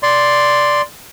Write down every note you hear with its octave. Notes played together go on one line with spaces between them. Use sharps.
D5 C6